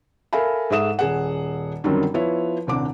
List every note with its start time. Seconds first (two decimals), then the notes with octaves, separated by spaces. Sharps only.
0.33 A4 A#4 E5 F5 G#5 B5
0.70 G#2 G#4 A4 E5 D#6 E7
0.99 D#1 G#4 F#5
1.84 F#2 D3 D#3 F#3 G3 C4
2.14 F3 B3 E4 C#5
2.67 D#1 C2 C4 D4 D6